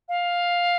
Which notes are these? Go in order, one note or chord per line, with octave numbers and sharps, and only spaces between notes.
F5